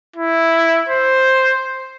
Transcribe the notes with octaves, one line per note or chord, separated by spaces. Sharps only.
E4
C5